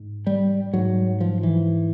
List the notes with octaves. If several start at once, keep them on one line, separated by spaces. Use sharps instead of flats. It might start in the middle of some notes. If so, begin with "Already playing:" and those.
Already playing: G#2
G3
G#2 F#3
F3
E3